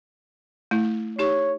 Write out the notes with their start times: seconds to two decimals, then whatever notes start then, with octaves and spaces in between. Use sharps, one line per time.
0.71 A3 E4
1.19 D#4 G4 C#5 C#6